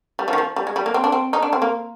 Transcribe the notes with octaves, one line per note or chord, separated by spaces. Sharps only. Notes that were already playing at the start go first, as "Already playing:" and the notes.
G3
F3
D#3
F3
G3
G#3
G3
A#3
C4
D4
C4
D#4
D4
C4
A#3